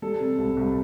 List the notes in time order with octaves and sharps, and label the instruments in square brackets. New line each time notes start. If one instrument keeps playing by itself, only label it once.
[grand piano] G3 A4
C3
C2
C2